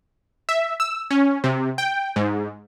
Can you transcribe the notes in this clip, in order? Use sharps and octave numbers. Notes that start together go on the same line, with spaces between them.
E5
E6
C#4
C3
G5
G#2